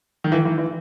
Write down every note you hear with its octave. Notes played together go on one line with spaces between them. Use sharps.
D#3
E3
E3
E3